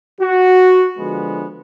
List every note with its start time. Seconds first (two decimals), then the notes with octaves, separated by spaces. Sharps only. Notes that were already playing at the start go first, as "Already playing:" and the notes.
0.21 F#4
0.95 D3 F3 G#3 B3